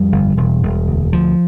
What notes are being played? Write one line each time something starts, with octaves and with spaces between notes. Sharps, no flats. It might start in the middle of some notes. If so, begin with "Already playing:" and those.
Already playing: F2 G3
G1
E1
E1
D2
D2 F3